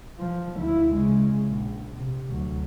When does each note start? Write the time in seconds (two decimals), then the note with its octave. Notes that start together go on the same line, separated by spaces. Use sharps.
0.19 F3
0.58 D2 E4
0.94 C#3 G#3
1.49 A#1
1.97 C3
2.31 D2 F#3